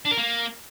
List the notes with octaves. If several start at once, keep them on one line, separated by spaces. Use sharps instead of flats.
D4
A#4
A#3